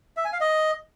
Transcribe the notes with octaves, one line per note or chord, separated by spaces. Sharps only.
E5
G#5
F5
D#5